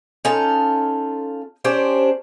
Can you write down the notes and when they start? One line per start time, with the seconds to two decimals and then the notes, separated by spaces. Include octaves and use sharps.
0.25 C#4 D#4 F4 A4
1.65 C#4 D4 G4 C5